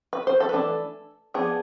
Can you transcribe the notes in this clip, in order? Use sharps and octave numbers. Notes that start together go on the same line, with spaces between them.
B4
C5
A4
B4
E3 A3 D4 A4
F3 B3 D4 G#4